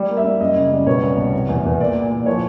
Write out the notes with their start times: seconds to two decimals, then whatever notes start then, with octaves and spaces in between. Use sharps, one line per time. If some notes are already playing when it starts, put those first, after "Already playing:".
Already playing: G3
0.09 A#3
0.17 E5
0.24 G3
0.40 F#2 D#5
0.56 C#3
0.72 G3
0.86 B2 C#5
1.03 C2
1.18 B2
1.33 C3
1.49 E2
1.65 E2
1.80 A#2 D5
1.95 A#2
2.11 A#2
2.26 F3 C#5